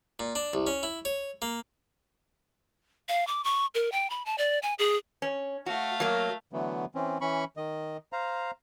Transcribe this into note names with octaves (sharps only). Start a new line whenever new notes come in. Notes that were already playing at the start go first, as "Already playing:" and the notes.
A#2
D4
C2
C#4
E4
C#5
A#3
F5
D6
C#6
A#4
G5
B5
A5
D5
G#5
G#4
C#4
A3 F#4 F5
F#3 A#3
D3 E3 F#3 A3 B3
E3 C4 C#4
E3 C#4 B5 C#6
D#3 D#5
C5 F5 A#5